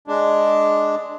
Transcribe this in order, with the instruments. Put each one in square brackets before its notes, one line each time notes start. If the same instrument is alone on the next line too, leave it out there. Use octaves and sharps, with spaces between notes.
[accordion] G#3 D4